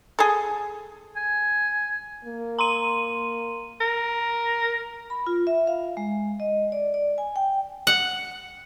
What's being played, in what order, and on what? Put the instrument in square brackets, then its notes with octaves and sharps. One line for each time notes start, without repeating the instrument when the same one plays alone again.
[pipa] G#4 A4
[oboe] G#5
[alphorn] A#3
[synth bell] A#5 C6 D#7
[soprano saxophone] A#4
[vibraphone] B5
F4
E5
F5
G#3
D#5
D5
D5
G#5
G5
[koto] F#5